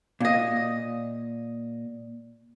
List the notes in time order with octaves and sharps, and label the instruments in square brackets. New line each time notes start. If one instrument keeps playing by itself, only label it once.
[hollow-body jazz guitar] A#2 D#5